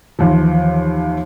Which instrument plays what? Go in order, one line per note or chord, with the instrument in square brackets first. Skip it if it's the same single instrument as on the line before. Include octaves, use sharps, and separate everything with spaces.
[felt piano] D#2 E3 F3